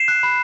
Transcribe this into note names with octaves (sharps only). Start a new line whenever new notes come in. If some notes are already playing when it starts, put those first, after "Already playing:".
Already playing: C7 E7
F#6
B5